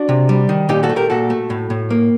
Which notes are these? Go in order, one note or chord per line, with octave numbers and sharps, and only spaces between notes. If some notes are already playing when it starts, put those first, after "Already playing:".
Already playing: D4 F#4
C3
G3
D#3
A#2 D#4 G4
F#4 A4
A3
G4 A#4
A#2 F#4 A4
A3
A2
A2
A#3